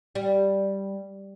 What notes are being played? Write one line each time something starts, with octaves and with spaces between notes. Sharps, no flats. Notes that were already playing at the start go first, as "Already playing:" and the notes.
G3